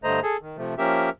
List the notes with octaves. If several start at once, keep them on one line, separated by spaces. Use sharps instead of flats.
G2 D3 A3 C5 D#5 A#5
G#4 A4
D#3
C3 F3 A3
F3 A#3 C#4 G4 A#4 E5